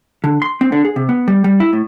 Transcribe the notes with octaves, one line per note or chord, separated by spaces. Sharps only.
D3
C6
C4
D3
G#4
C3
B3
G3
G3
E4
A2